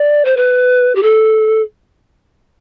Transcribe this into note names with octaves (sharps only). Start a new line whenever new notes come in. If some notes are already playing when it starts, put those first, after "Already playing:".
Already playing: D5
C5
B4
G4
A4